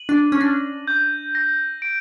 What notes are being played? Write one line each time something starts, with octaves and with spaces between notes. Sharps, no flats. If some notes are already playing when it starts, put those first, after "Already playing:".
Already playing: D#7 F#7
D4
C#4
D4 A#6
G6
A#6
D7